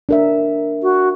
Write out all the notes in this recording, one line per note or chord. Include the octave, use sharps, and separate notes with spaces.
D4 A#4 E5
F#4